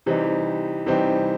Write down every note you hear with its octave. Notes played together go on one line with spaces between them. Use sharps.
C3 E3 G3 C4 D#4
C3 E3 G3 C4 D#4